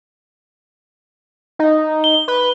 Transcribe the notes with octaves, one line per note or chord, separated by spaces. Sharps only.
D#4
G7
B4